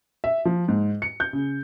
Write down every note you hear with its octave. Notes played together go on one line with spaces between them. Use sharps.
E5
F3
G#2
C#7
G6
C#3